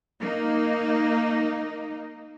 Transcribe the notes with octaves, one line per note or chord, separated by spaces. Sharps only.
A#3 D#4